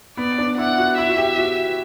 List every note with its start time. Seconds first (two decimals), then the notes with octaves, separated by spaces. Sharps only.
0.17 B3 D5
0.38 D4
0.58 E4 F#5
0.78 F#4
0.97 E4 E5
1.09 F#4
1.17 G4
1.38 F#4